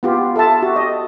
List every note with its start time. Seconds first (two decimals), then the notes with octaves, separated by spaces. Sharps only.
0.03 B3 F4 G4
0.36 A4 E5 A5
0.62 F#4 G4
0.76 D#5